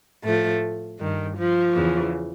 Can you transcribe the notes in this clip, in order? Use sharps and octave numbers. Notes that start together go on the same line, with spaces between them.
A2 F3 A3
G2 D#3
F3
E2 C#3 E3